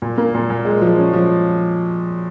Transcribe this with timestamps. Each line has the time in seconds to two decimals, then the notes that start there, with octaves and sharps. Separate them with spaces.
0.02 A#2
0.18 A#3
0.34 A#2
0.50 A#2
0.65 G#3
0.82 F3
0.98 C#4
1.13 F3